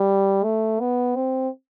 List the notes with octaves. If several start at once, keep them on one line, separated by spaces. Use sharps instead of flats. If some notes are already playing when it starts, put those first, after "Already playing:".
Already playing: G3
A3
B3
C4